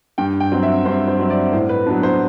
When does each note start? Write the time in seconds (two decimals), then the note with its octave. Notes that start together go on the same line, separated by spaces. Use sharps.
0.18 G2 G5
0.40 G5
0.52 F#3 C4
0.63 E5
0.85 G2 C5
1.08 C5
1.19 F#3 C4
1.30 D5
1.53 A2 C5
1.69 B4
1.86 F#3 B3 D4
2.03 C5